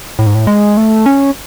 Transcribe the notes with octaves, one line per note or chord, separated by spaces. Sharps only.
A2
G#2
A2
G#3
A3
C#4